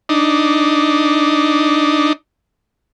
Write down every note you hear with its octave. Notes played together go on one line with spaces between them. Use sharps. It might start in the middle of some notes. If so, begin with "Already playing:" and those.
D4 D#4